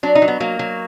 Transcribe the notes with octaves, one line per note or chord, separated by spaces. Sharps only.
F#3 D4
D#4
F#3
B3
F#3 A#3
F#3